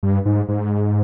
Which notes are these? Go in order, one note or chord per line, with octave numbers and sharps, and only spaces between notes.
G2
G#2
G#2